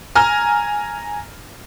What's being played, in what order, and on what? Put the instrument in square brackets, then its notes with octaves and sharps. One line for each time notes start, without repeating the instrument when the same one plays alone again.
[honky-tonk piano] G#5 A#5 F6